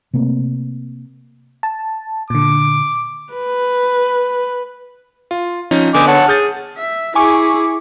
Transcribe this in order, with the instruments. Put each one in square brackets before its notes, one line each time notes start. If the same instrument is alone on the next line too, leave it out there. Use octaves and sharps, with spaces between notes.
[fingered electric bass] C3 A3 A#3 C4
[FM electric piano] A5
[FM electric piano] A#2 D3 [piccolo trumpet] D6
[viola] B4
[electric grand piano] F4
F3 C#4 D#4
[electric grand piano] D3 B3 G6 [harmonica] D#5 G#5 D6
[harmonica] C#5 F#5 A5
[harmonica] G#4 [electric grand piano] F6 G6 A6
[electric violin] E5
[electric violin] E4 G#4 [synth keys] G#5 C#6 D6